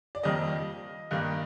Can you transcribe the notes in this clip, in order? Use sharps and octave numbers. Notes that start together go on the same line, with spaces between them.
D5
F2 D#3 G3 A#3 D#5
G2 D#3 A#3